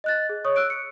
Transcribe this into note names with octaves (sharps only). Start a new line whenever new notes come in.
D#5 F#6 A6
G#4
C#5 C#6 D#6
E6 F#6 D7
C#7